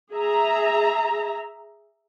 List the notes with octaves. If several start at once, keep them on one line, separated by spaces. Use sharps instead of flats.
G#4 E5 A#5